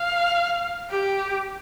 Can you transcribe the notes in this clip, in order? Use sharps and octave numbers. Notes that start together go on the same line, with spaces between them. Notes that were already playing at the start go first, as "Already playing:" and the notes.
Already playing: F5
G4